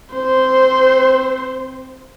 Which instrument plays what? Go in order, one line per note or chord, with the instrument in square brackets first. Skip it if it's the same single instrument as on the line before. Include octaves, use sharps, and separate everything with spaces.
[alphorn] C4 [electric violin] C5